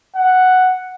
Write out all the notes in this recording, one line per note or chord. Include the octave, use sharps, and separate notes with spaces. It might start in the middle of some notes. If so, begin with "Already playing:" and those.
F#5